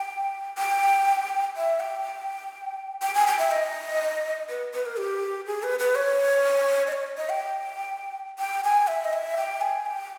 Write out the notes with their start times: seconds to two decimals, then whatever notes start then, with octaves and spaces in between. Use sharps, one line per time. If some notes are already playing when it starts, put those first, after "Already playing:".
Already playing: G5
0.58 G5
1.56 E5
1.80 G5
3.02 G5
3.15 G#5
3.27 G5
3.39 E5
3.51 D#5
4.49 B4
4.74 B4
4.86 A#4
4.97 G4
5.46 G#4
5.63 B4
5.79 B4
5.95 C#5
6.87 D#5
6.92 C#5
7.17 D#5
7.29 G5
8.39 G5
8.64 G#5
8.87 E5
9.04 D#5
9.13 E5
9.37 G5
9.61 G#5
9.86 G5